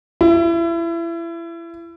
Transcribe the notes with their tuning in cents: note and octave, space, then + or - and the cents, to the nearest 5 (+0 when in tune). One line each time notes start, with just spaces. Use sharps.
E4 +30